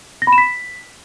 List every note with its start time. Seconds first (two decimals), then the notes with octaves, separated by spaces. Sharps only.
0.22 A#6
0.27 B5
0.33 E7
0.38 B6